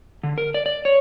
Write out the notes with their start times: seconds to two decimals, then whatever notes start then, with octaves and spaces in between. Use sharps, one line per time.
0.23 D3
0.38 A#4
0.54 D5
0.66 D5
0.85 C#5